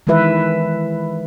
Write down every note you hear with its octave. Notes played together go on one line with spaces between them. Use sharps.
D#3 E3 G#3 E4 B4 E5